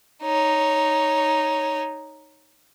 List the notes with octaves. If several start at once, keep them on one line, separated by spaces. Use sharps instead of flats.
D#4 C#5